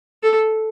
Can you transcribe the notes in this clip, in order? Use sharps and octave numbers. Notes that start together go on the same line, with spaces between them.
A4